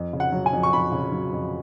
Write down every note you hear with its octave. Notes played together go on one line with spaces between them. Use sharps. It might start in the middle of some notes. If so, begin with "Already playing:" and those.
Already playing: F2
C#3
F#5
F#3
G#5
F2
C#6
F2 B5
C#3
F#3
F2